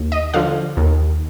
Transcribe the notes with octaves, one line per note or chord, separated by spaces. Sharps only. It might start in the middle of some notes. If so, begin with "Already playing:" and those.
Already playing: D#2
D#5
D3 F3 F5
D#2